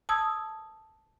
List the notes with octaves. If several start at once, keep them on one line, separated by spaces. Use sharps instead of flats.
A5 D#6 E6 G#6